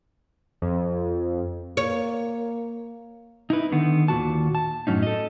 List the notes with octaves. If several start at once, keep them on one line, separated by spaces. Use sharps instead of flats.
F2
A#3 C#5
D#4 E4 B4
D3 D#3 B3
D#2 A#2 F#4 A5
A5
F#2 A2 D3 F#3 C#4 D#4
A4 D#5